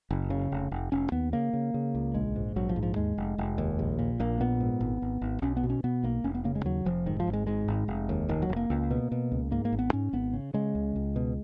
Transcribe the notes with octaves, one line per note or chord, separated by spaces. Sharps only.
F#1
C#3
F1
F1
F1 C#4
D#2 B3
C#3 A#3
C#3
C#3
C#2
A#1 G#3
G#2
A#1 F#3
F3
G#2
F3
D#2 G#3
F1
F1
D#2
A#1
A#2
A#1 A#3
A#2 B3
G#2
G#1
G#1
G#1
B1 C#4
B3
B2
C#4
B2 B3
B1 A#3
F1 C#4
B3
C#3 A#3
G#3
D#2 F#3
F1 F3
G#2 D#3
F3
G#1
G#3
G#2 G#3
G#1
F1
D#2
F1 D#3
F#3
F1
A#3
C#2
B2
B2
C#2
G#2 A#3
A#3
G#1
B3
G#2 C#4
G#1 B3
C#3
C#3 G#3
C#2
C#2
B2